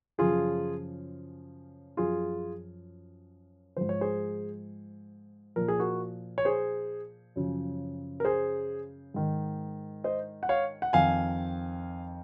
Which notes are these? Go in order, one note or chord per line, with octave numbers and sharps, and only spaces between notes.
F#2 C#3 F3 F4 G#4
F#2 F3 F4 G#4
G#2 F3 C5
C#5
G#4 C5
A#2 F3 A#4
G#4
F#4 A#4
C#5
G#4 C5
F#2 C#3 F3
A#4
G#4 C5
G#2 D#3
C5 D#5
F#5
C#5 F5
F#5
F2 D#3 F5 G#5